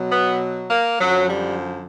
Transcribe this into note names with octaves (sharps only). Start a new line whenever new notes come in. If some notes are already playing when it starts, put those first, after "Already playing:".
Already playing: B2 F#3
B3
A#3
F#2 D3 F3 F#3
G3